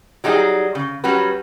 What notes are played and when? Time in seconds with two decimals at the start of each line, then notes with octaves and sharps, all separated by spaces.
0.24 F#3 G3 D#4 G#4
0.75 C#3
1.04 F#3 G3 C#4 F#4 B4